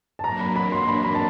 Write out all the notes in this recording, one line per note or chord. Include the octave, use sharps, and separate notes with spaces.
A5
F#3 A#3 D4 A#5
B5
B5
C6
C6
B5
B5
A5